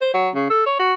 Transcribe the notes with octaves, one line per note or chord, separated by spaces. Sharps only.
C5
F#3
C#3
A4
C#5
F#4